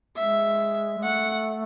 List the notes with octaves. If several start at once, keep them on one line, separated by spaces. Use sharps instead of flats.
G#3 E5
G#3
A3 F#5